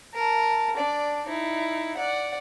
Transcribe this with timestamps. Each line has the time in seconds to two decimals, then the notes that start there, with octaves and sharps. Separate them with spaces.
0.14 A#4 A5
0.76 D4 D5
1.26 D#4 E4
1.97 D5 F#5